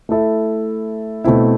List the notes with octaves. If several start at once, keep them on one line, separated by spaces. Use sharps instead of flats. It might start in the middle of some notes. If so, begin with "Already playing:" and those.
A3 E4 A4 E5
B2 A3 C4 E4